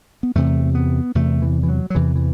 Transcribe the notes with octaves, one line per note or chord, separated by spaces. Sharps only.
B3
E2 C3 A3
B3
E2 C3 A3
E3
E3
F#3
F#3
E2 C3 E3
E3